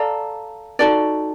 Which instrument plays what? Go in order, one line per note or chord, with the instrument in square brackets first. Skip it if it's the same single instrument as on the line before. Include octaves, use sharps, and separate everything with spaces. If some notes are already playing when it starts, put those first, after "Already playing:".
Already playing: [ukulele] A4 D5 F5 A#5
D#4 F#4 A4 D5